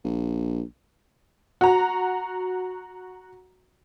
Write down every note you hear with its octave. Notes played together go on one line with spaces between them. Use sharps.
A#1
F#4 A#5